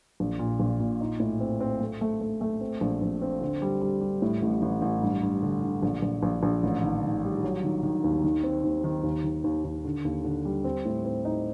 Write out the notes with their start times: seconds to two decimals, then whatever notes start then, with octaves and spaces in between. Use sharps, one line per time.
0.20 A#1
0.39 A#2
0.60 A#1
0.80 A#2
1.01 D#4
1.20 A2
1.40 C4
1.60 C4
1.80 A3
2.01 A3
2.21 A3
2.41 A3
2.61 C4
2.81 A#1
3.01 A#1
3.22 C4
3.41 D3
3.62 G3
3.82 G3
4.01 G3
4.22 A2
4.42 A1
4.62 A1
4.82 A1
5.02 G2
5.22 G2
5.43 D3
5.63 D3
5.82 A#1
6.02 A#1
6.23 A#1
6.43 A#1
6.63 A1
6.83 D#3
7.04 D#3
7.23 G3
7.43 F#3
7.64 D#3
7.83 D#3
8.04 D#2
8.24 D#3
8.43 C4
8.64 D#2
8.84 D#3
9.04 D#2
9.24 D#3
9.44 D#2
9.65 D#2
9.84 D3
10.05 D#2
10.25 D3
10.45 G3
10.64 C4
10.85 A2
11.05 C4
11.25 D#4